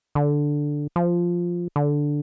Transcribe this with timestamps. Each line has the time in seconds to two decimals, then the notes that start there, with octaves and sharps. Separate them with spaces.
0.15 D3
0.96 F3
1.76 D3